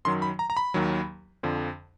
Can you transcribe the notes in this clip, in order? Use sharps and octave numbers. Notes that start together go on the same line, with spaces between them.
F#2 D#3 F#3 C6
B5
A#5
A#5
B5
D#2 D#3 F#3
F2 D3 F3